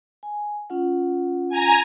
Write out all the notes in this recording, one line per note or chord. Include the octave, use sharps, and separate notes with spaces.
G#5
C#4 F4 F#5
G#5 A#5